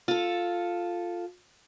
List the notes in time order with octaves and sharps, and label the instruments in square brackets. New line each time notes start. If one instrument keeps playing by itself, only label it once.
[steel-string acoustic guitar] F4 A4